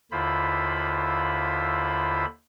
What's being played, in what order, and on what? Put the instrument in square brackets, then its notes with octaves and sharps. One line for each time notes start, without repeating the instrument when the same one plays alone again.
[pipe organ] D#2 D3 E4 F4 C5 B5